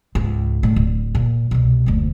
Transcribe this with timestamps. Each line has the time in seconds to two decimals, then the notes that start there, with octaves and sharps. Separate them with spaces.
0.15 C#2 G#2
0.63 A2 D3
0.76 D1
1.15 A#2
1.51 C2 B2
1.86 F#1 D2